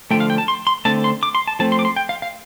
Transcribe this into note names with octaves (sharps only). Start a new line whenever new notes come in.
D3 F3 A3 G5
F5
G5
A5
C6
C6
D3 A3 C4 A5
C6
D6
C6
A5
F3 A3 C4 A5
C6
D6
C6
G5
F5
F5